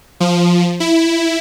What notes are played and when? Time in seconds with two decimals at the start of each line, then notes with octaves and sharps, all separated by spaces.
0.20 F3
0.80 E4